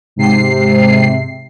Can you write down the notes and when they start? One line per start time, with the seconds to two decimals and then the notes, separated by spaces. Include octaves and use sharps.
0.16 G#2 C3 C7